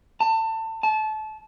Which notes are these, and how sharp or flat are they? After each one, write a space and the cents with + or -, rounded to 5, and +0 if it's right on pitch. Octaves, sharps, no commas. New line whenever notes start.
A5 +25
A5 -25